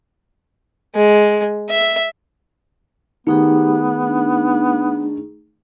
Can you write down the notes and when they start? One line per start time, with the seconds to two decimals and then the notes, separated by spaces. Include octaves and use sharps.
0.95 G#3
1.70 E5
3.27 D#3 A3 B3 D#4 G4 G#4
4.04 D4